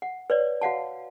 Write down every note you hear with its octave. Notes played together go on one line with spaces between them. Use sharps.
F#5
B4 C#5 D5
F#4 F5 F#5 A5